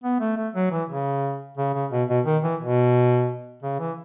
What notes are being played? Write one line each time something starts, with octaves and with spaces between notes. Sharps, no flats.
B3
A3
A3
F#3
E3
C#3
C#3
C#3
B2
B2
D#3
E3
B2
C#3
E3